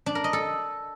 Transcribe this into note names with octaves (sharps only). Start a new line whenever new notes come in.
D4
A#4
D#5
A4